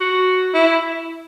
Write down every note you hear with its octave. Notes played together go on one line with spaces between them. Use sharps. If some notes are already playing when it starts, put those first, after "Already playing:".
F#4
E4